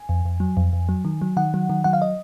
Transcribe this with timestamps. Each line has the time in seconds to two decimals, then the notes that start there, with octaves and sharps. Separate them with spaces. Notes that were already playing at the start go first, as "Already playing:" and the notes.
Already playing: G#5
0.09 F2
0.25 F2
0.40 F#3
0.57 F2
0.73 F2
0.89 F#3
1.05 D#3
1.22 F#3
1.37 D#3 F#5
1.54 F#3
1.70 D#3
1.84 F#3 F#5
1.93 F5
2.02 D#5